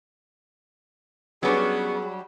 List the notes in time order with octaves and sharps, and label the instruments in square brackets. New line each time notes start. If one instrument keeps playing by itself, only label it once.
[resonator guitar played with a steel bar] F#3 G3 D4 [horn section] B3 C#4 [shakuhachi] G#4